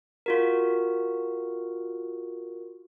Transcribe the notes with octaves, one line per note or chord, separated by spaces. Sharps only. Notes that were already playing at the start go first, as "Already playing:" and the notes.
F4 F#4 A#4